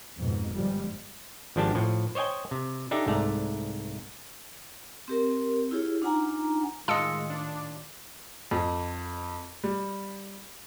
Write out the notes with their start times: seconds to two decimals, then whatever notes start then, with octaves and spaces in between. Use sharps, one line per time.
0.20 F2 G#2 B2
0.52 G1 F3 G3 G#3
1.56 G#1 F3 D4 G4 A5
1.75 A2 F3
2.15 C5 C#5 D#5 G5 G#5
2.51 C3
2.91 D4 D#4 G4 A4 E5
3.06 C2 G#2 A3 D5 A#5
5.08 C4 G4 A#4
5.71 E4 F4 G4 G#4 C#5
6.02 D4 D#4 F4 F#5 G#5 A#5
6.88 A2 D#3 G#3 F4 D#5 A5 E6 C#7
7.30 D4
8.51 F2
9.64 G3